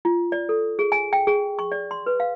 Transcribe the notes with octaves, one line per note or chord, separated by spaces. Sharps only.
F4
D5
A4
G#4
G#5
G5
G#4
C#6
D5
C6
B4
F5